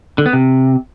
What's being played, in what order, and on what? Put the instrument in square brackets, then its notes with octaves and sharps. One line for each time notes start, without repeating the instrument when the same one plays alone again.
[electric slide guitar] D3
B3
C3